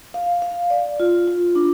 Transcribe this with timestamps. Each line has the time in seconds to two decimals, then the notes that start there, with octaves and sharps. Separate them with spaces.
0.14 F5
0.42 F5
0.70 D5
1.00 F4
1.28 F4
1.55 D4